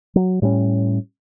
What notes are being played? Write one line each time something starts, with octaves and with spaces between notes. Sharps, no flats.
F#3
A2 G3 A3 C#4